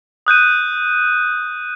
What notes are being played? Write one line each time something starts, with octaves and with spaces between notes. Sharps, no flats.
D#6 F#6 G6 D#7